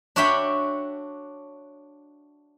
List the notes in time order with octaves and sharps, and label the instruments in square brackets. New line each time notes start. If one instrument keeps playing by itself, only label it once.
[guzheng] D4 F#4 C#5 E5 G5 B5